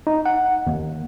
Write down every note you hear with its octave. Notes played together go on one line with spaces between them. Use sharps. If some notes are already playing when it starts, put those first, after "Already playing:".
D#4
F#5
D#2